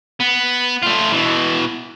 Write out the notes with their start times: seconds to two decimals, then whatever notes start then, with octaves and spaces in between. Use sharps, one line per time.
0.20 B3
0.82 A3 F4
1.12 B2 E3